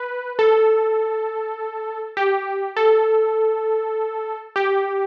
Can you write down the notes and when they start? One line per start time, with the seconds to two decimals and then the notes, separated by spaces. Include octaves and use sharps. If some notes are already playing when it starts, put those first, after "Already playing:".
Already playing: B4
0.39 A4
2.17 G4
2.77 A4
4.56 G4